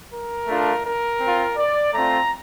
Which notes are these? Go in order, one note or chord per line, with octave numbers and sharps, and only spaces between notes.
A#4
A3 D4 F4
A#4
C4 F4
D5
A3 C4 F4 A#5